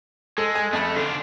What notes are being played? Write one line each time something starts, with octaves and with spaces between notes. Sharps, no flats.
G#3 A4
G#5
F2 A3 A5 B5
D3 D4 F4